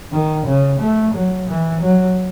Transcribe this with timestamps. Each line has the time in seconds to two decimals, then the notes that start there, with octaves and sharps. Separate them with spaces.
0.12 D#3
0.46 C#3
0.79 A3
1.14 F#3
1.47 E3
1.81 F#3